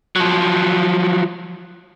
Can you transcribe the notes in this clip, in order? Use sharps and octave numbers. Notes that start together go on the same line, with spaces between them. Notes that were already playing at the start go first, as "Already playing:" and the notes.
F3 F#3